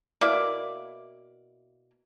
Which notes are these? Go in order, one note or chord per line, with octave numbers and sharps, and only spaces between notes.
B2 A#3 E4 D5